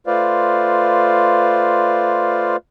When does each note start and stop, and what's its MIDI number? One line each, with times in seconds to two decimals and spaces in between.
0.07 2.56 57
0.07 2.56 65
0.07 2.56 71
0.07 2.56 72
0.07 2.56 74
0.07 2.56 77